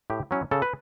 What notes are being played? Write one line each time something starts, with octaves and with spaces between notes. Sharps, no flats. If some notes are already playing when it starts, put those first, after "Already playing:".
A2 G4
F#3 C#4 E4
C#3 A4
B4